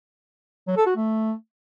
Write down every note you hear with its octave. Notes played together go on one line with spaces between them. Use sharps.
F#3
A4
F#4
A3